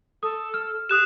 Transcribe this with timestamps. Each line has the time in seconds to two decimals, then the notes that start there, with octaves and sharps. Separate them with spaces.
0.23 A4 D#6
0.54 F6
0.89 G4 D#6 F#6 E7